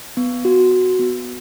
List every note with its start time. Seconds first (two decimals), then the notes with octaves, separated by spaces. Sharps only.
0.17 B3
0.45 F#4
0.71 F#4
0.99 B3